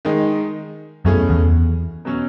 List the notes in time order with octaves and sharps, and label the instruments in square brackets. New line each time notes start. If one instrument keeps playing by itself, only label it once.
[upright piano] D#3 G#3 D#4
[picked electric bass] F#2 [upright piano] B2 A3 C#4 E4 G#4
[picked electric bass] E2
[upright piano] B2 F#3 C#4